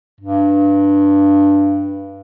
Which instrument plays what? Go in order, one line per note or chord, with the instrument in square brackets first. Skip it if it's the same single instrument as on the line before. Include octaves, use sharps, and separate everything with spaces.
[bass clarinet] G2